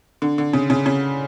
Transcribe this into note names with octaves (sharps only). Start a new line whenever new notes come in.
D3
D3
C#3
C#3
C#3